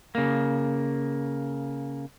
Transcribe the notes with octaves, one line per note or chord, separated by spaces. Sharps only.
C#3 A#3